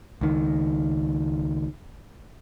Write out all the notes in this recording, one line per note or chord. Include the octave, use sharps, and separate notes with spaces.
C#2 D#3